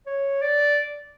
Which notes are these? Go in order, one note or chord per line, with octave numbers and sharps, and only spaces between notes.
C#5
D5